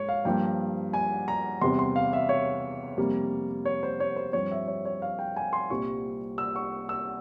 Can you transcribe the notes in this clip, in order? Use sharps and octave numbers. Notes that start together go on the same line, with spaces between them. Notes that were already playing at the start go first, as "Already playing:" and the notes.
Already playing: A#1 G#2 C#5
F5
G2 F3 A#3 G5
G#5
A#5
E2 C3 G3 C6
C6
F5
E5
C#5
F2 C3 G3 A#3
C#5
C5
C#5
C5
G2 F3 C4 C#5
E5
C#5
C#5
F5
G5
G#5
C6
C2 A#2 G3 C4 C#6
E6
C#6
E6